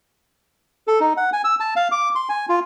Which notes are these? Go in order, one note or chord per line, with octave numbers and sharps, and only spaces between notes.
A4
D#4
F#5
G#5
E6
A5
F5
D6
C6
G#5
F4